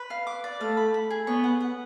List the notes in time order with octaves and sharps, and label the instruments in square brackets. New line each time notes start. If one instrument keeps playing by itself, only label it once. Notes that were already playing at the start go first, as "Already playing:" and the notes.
Already playing: [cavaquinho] B4
F5
D6
D5
[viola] A3 [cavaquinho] F5
[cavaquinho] B5
B5
G#4
[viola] B3 [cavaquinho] C#5
[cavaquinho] F#5
F#5